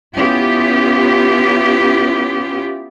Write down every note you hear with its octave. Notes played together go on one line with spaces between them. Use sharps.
B3 C#4 E4 F4 G4